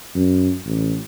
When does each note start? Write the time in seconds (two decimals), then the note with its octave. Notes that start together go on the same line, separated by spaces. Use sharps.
0.15 F#2
0.66 A1